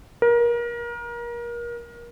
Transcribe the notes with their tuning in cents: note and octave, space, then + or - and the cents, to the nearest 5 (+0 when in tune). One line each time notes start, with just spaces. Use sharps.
A#4 +30